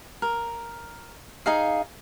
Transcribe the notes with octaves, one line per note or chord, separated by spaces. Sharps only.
A#4
D#4 G#4 F5